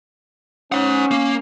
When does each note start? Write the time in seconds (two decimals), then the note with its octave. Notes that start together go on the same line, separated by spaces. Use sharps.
0.72 C#4 C5 F#5
1.11 A#3